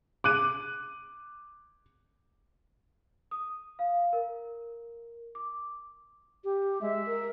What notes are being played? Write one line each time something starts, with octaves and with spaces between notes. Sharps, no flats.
D6 F#6 D#7
D#6
F5
A#4
D6
G4
G#3 E5
A#4